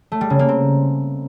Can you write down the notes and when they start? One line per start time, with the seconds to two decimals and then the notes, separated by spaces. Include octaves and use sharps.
0.12 A3
0.21 G3
0.30 C#3
0.39 A#3
0.49 C4